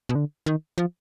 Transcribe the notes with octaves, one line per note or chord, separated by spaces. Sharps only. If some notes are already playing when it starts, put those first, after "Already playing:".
B2
D3
D#3
F3